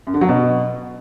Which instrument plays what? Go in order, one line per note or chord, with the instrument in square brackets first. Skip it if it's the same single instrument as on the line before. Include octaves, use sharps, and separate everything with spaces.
[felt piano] F#2
D3
F#3
B2